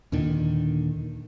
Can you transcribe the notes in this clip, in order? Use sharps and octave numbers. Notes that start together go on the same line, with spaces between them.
D#2 A#2 D3 D#3